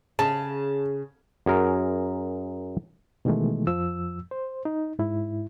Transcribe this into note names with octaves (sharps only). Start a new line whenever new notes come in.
C#3 A5
F#2 G#4 A#4 A#5
B2 D#3 E3 G#3 A3
F2 F3 E6
C5
D#4
G#2 E4